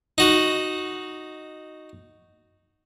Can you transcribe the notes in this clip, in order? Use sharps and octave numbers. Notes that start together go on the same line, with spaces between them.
D#4 F#4